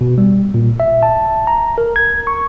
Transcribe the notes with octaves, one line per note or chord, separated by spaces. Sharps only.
B2
G3
A#2
E5
A5
A#5
A#4
G#6
C#6